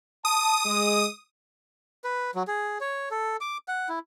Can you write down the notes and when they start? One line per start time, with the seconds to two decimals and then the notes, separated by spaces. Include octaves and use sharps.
0.25 A5 D#6
0.65 G#3
2.04 B4
2.35 F#3
2.47 G#4
2.80 C#5
3.11 A4
3.41 D6
3.68 F#5
3.89 E4